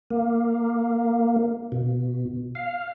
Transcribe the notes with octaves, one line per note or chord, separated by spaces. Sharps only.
A#3
B2
F5